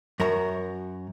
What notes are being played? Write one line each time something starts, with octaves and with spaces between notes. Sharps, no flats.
F#2 A#4 C#5 A#5